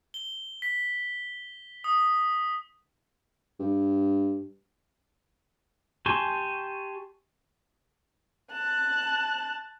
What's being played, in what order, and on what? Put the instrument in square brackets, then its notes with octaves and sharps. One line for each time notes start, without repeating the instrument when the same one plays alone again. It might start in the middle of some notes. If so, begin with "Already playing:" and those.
[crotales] G7
B6
D#6
[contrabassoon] G2
[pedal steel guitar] G4 G#5 A5 C6 C#6
[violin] A5 F#6